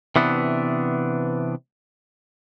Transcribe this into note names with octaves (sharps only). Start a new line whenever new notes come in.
C3 E3 B3 D4